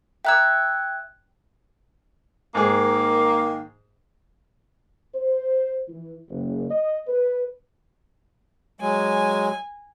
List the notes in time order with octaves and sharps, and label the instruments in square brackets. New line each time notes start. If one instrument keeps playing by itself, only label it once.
[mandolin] E5 A#5 E6 [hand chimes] G5 F#6 G#6
[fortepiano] G#2 G#4 [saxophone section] D#3 A#3
[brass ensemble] C5
E3
F#1
D#5
B4
[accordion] F#3 G#3 [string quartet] G#5